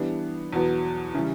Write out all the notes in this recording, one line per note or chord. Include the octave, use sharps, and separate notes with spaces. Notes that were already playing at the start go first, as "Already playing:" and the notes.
Already playing: E3 G3 B3 D4 G4
E2 B2 F#3 B3
C#3 E3 G3 C#4